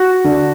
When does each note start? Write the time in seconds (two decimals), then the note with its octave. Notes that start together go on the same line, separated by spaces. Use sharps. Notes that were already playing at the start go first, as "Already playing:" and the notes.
Already playing: F#4
0.24 D3